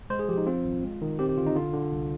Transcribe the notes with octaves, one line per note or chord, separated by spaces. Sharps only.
G#3 C5
G#4
F3 G4
D#4
C4 F4
G#1
G#3
D#3
C4 G4
G4
D3 F4
D#4
D3 F4
D3
C2